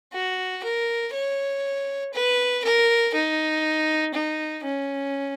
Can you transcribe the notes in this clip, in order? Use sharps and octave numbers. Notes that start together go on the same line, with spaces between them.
F#4
A#4
C#5
B4
A#4
D#4
D#4
C#4